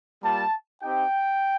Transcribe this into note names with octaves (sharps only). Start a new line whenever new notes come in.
G3 A#3 F4 A5
C4 D#4 G4 G5